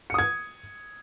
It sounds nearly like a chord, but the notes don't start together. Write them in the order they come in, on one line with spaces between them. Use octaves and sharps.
C#7 D#6 G#6